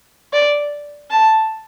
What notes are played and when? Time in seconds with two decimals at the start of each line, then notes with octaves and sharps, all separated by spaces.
0.33 D5
1.11 A5